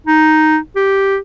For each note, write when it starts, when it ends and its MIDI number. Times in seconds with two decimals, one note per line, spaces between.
0.07 0.58 63
0.76 1.18 67